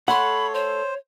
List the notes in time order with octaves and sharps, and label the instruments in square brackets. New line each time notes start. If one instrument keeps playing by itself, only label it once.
[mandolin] A3 A4 C6 [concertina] C#5 [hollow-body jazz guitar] F#5 [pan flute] B5
[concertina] C5 [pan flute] C#5